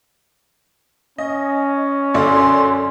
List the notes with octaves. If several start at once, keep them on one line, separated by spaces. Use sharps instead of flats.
C#4 D#5
F#2 D3 D5 C6